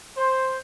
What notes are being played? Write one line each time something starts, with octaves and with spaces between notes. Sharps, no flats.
C5